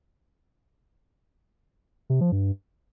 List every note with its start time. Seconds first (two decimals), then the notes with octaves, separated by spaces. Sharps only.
2.10 C3
2.21 F3
2.32 G2